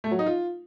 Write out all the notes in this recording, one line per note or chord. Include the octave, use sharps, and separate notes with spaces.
A3
F#3
D#4
F4